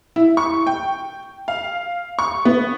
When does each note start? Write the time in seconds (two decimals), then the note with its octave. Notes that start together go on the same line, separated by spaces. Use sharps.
0.16 E4
0.37 C#6
0.67 G5
1.48 F5
2.19 C#6
2.45 B3